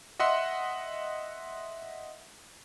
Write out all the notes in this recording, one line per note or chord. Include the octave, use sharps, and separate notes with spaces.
D#5 E5 F#5 C6